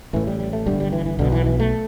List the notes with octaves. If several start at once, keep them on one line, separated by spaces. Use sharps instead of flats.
A1 A2 E3
G3
G3
A3
G1 G2 D3 G3
G3
E3
E3
B1 B2 D3
E3
E3
A3